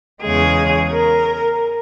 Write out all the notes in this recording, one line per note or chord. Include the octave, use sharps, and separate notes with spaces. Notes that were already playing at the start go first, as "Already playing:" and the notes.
E2 C#3 G#3 G#4
A#4